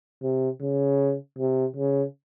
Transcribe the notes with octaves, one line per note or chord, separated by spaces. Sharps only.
C3
C#3
C3
C#3